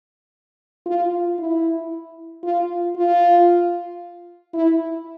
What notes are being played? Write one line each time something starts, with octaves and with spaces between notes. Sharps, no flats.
F4
E4
F4
F4
E4